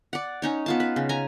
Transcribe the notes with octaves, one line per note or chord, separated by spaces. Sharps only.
D5 F#5
C#4 D#4 C#5
B3 F4 A5
B4
C#3
G#5 A#5